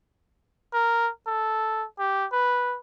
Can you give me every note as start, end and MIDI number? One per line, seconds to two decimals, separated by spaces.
0.73 1.10 70
1.27 1.85 69
1.99 2.26 67
2.32 2.77 71